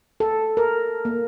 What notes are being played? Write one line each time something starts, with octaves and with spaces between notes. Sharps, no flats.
A4
A#4
A#3